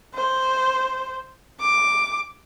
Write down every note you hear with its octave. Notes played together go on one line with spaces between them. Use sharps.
C5
D6